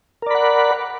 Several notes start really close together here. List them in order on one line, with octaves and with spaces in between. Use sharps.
A#4 D5 B5 F#5